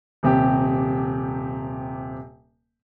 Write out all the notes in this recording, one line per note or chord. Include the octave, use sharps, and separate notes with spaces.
D#1 C3 G4